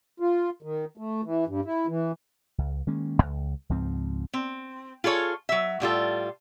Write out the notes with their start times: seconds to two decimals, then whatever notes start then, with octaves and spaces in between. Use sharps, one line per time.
0.20 F4
0.63 D#3
0.97 A3
1.24 E3
1.47 G2
1.65 E4
1.87 E3
2.58 C#2
2.87 D#3 G#3 A#3 C#4
3.18 D1 C#2
3.69 C#2 G#2 F3 C4
4.33 C4
5.04 F4 G#4 A4 C#5
5.49 F#3 E5
5.80 A2 G3 F4 A4